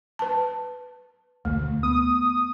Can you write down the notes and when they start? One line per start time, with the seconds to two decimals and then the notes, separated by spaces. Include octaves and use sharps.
0.19 B4 A5
1.45 E1 D2 A3
1.83 B3 D#6